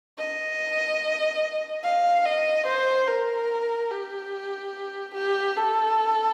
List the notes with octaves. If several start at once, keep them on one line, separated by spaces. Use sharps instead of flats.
D#5
F5
D#5
C5
A#4
G4
G4
A4